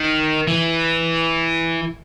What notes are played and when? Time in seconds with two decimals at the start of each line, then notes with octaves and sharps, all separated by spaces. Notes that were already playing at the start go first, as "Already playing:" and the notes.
Already playing: D#3
0.47 E3